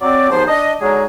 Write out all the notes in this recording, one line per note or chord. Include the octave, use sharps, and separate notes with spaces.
F#3 C4 D5
D#2 G#2 F3 B3 C5
D4 D#5
D3 F#3 G#3 D#4 G#4